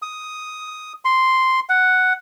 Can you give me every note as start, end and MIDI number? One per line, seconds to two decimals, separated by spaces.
0.02 0.93 87
1.05 1.60 84
1.69 2.13 78